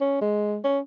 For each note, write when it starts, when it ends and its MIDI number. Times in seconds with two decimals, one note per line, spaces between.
0.01 0.16 61
0.21 0.59 56
0.64 0.80 61